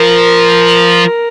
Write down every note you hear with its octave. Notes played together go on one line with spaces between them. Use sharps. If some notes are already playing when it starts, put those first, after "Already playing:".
Already playing: F3 A#4